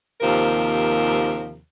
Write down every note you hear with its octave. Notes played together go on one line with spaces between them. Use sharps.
D#2 C3 F3 A#4